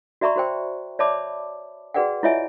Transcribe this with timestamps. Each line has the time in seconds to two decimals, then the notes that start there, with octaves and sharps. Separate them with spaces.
0.21 F#4 D5 E5 A#5 B5 C#6
0.36 F#4 C5 G5
0.99 C#5 D5 E5 A5 B5 D6
1.94 F#4 G#4 B4 D5 F#5 G5
2.23 E4 F4 C#5 D#5 E5 G#5